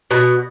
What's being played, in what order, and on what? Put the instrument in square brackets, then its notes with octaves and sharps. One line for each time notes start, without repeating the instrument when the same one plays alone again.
[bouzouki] B2